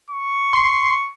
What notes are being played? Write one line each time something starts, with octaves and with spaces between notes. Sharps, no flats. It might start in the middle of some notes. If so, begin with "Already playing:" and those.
C#6
C6 C7